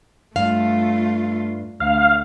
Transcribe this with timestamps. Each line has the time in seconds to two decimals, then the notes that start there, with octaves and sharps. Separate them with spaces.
0.36 G2 A3 F4 F5
1.80 D2 F5